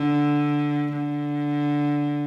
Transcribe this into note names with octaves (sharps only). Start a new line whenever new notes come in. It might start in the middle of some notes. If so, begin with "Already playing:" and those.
Already playing: D3
D3